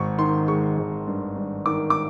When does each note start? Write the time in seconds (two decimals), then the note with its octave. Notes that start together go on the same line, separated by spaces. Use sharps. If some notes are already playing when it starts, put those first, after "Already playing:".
Already playing: G#1 C#6
0.18 D#3 C6
0.48 G#3 C#6
0.78 G#1
1.07 G2
1.37 G2
1.66 D#3 D6
1.90 D6